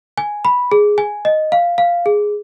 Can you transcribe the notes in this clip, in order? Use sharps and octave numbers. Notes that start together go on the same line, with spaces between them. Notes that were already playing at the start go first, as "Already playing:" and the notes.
G#5
B5
G#4
G#5
D#5
F5
F5
G#4